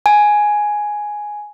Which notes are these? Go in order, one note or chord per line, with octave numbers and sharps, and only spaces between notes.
G#5